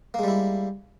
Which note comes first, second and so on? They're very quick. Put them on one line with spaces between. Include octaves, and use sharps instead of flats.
A#3 G#3 G3 E4